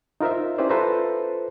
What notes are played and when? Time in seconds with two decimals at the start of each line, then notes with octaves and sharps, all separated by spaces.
0.21 D#4 F4 A#4 C5 E5
0.58 C#4 E4 G4 B4 C5 D5
0.69 F4 A4 B4 C5 E5 A#5